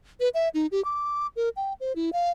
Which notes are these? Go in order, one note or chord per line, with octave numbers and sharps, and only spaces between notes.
B4
E5
D#4
G4
D6
A#4
G5
C5
E4
F5